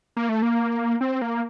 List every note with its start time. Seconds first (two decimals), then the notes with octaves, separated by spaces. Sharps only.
0.16 A#3
0.29 A3
0.42 A#3
1.01 C4
1.22 A#3